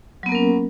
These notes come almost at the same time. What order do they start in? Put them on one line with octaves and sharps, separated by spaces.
F#3 B3 A#3 A#4 C#4